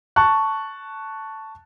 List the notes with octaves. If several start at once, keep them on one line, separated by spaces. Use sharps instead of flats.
A5 C#6 F#6